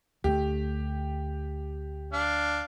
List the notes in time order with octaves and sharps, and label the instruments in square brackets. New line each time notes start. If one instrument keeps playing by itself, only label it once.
[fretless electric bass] D2 A3 [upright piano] G4
[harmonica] D4 F5